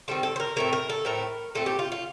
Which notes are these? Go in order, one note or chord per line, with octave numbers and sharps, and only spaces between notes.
D#3 G3 C4 A4
A4
C5
A#4
A2 A3 C4 A#4
A#4
A4
A2 A3 C4 A#4
A#2 A3 C4 A4
G4
F4
F4